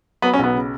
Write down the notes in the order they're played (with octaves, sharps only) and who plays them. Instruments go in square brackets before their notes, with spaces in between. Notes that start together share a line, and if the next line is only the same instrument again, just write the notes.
[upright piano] F#3 B3
C#4
B1 B3
C#3